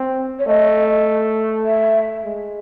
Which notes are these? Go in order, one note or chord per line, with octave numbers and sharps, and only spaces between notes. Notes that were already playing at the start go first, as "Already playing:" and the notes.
Already playing: C4
C#5
A3 D#5
E5
G#3